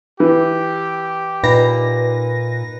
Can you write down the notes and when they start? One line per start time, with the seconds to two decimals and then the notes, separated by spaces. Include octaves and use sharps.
0.20 E3 G4
1.43 A#2 D#4 B4 A#6